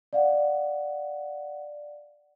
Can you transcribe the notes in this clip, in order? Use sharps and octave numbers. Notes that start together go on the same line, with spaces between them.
D5 F5 F#5